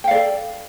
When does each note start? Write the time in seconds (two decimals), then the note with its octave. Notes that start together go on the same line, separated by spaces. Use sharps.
0.04 G5
0.08 F5
0.11 D5
0.15 A4